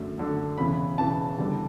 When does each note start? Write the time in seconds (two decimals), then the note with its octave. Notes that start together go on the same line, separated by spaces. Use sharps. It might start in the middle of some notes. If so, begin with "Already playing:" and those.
Already playing: F#2 D3 F#3 A3
0.18 F#2 D3 F#3 A3
0.58 E1 E2 C#3 E3 B5
0.97 E1 E2 C#3 E3 A5
1.38 F#1 E2 D3 G3